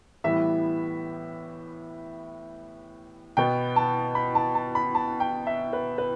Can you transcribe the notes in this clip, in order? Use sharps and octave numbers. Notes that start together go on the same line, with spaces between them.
A2 E3 G3 B3 E5
B2 B3 G5
A5
B5
A5
A5
B5
A5
G5
E5
B4
B4